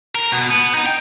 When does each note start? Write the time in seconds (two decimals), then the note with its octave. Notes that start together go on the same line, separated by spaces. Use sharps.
0.15 A#4
0.32 B2
0.50 B3
0.74 D#4
0.86 G5